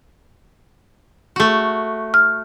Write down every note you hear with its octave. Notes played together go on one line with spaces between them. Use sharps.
A3 F#4
F6